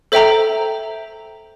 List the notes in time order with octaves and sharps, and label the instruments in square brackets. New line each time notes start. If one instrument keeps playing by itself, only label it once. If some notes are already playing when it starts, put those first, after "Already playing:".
[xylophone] A4 C5 E5 G5 A#5